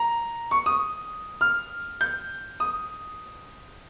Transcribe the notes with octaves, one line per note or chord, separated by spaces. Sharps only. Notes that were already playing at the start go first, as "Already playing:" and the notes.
Already playing: A#5
C#6
D#6
F6
G6
D#6